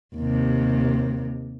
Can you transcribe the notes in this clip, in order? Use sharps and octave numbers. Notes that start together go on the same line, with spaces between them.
D#2 C3